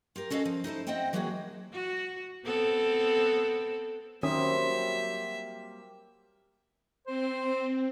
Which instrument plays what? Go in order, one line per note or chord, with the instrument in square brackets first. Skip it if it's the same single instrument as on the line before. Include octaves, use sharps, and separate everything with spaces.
[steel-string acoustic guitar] F4 G4 A#4
C#4 F#4 A4 D#5 F5
F3
D#4 E4 A4 C5
C4 C5 D#5 E5 F#5 G5
E3 F#3 G#3 A#3 F#4 G#4
[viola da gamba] F#4
B3 C4 A4
[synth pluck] D#3 C#4 D#6 [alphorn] F#3 [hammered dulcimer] G3 A#3 C4 [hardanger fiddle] E5
[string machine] C4 [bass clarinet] C5